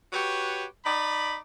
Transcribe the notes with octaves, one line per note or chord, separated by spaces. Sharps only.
F#4 G4 B4 C#5
D#4 D5 B5